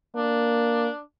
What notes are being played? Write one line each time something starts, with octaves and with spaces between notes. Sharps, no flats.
A#3 D4